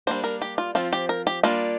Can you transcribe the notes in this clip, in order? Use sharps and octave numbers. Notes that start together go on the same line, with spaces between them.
G3 A#3 D4 C5
A#4
G4
F4
F3 C4 F4
G4
A#4
G4
G3 A#3 D4 F4